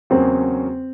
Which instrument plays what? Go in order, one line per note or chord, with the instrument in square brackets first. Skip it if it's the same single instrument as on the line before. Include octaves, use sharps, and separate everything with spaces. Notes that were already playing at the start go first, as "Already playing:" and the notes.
[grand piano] E2 C#3 F#3 A#3 C#4 [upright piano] C4